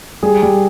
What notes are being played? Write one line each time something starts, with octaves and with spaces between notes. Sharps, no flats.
G3 G#4
G3